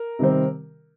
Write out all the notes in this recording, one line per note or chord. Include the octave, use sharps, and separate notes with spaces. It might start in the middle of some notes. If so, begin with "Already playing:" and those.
Already playing: A#4
C3 D#3 G3 C4